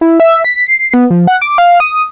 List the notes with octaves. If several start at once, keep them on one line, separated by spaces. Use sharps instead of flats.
E4
E5
B6
C7
B3
F3
F#5
D6
F5
D#6